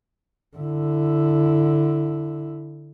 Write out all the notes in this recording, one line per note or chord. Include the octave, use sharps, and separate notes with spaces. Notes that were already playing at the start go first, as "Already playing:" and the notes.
D3 E4